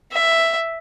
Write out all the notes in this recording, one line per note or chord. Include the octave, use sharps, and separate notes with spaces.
E5